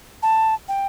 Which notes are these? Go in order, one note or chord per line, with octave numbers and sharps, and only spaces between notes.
A5
G5